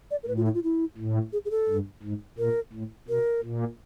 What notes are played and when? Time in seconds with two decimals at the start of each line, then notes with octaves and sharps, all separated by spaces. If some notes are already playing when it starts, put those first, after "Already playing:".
0.11 D5
0.23 A#4
0.28 A2 B4
0.37 F4
0.45 E4
0.54 F4
0.64 E4
0.98 A2
1.33 G#4
1.45 G#4
1.51 A4
1.69 G2
2.03 G#2
2.38 A#2 A#4
2.73 A2
3.08 B2 A#4
3.43 A#2